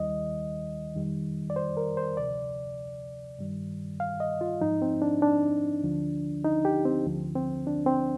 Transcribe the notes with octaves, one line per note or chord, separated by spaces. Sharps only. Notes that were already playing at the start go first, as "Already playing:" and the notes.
Already playing: D#2 D#3 G3 D#5
F2 D#3 G3
D5
C5
A#4
C5
D2 C3 F3 D5
G2 D#3 G3
F5
D#5
F4
G#2 F3 D#4
C4
D4
D4
D2 D3 F3
D#4
G4
C4
D2 D3 F3
C4
D4
C4